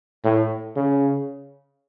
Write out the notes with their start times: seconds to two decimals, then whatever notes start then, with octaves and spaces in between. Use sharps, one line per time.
0.24 A2
0.76 C#3